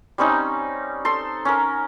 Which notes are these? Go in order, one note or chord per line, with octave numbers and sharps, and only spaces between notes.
G3 C4 C#4 D#4
A4 C6
C#4 A#4